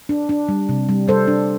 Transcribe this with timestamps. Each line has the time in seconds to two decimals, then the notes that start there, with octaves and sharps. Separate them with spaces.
0.09 D4
0.29 D4
0.49 G3
0.69 C3
0.89 G3
1.08 G3 A4 C5
1.27 D4